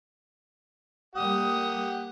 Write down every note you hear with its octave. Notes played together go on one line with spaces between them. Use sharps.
G3 A#3 G4 F#5 D#6